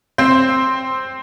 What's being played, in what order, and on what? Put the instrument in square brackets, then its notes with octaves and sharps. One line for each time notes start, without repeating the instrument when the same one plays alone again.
[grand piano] C4 C5